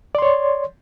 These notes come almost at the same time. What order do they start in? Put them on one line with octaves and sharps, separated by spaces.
D5 C6 C#5